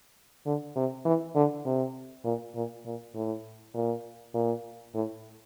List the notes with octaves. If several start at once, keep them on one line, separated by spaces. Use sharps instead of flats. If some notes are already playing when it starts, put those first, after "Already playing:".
D3
C3
E3
D3
C3
A#2
A#2
A#2
A2
A#2
A#2
A2